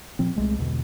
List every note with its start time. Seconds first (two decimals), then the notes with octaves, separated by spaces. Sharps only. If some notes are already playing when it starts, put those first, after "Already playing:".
0.19 A#2 F3 C4
0.36 C2 G#3 A3
0.59 E2 B2 D3